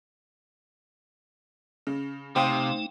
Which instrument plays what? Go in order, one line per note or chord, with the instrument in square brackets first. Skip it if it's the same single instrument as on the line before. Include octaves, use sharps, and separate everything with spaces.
[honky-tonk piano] C#3
[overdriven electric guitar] C3 [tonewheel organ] A3 D#4 [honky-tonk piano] C5 F5 D#6 [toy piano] G5